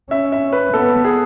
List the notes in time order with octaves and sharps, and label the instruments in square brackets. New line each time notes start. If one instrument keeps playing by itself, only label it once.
[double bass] C#4 [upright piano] E5
[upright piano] E5
B4
[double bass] B3 [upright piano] A4
[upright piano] G#4